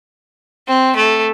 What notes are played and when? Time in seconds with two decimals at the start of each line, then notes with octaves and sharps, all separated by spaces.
0.68 C4
0.96 A3